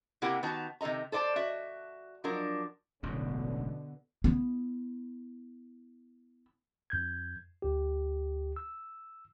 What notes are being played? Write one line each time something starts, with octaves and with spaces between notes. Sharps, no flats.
C3 A#3 E4 G4 A#4 F#5
D#3 B3 F#4 F#5 A5 A#5
C3 D#3 A4 D#5 A#5
A4 C5 D5 D#5 A5
F#4 E5
F3 F#3 D4 A#4
E1 A1 F#2 B2 D3
B3 E4
F2 G6 G#6
D2 G4
E6